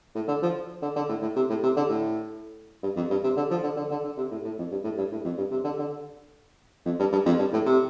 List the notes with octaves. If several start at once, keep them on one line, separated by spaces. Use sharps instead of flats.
A2
D3
F3
D3
D3
A2
A2
C3
A2
C3
D3
A2
G2
F2
G2
C3
D3
F3
D3
D3
D3
D3
C3
A2
A2
F2
G2
A2
G2
A2
F2
G2
C3
D3
D3
F2
G2
G2
F2
G2
A2
C3